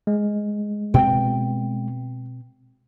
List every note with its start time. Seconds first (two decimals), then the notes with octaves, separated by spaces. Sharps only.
0.07 G#3
0.94 B2 C4 G5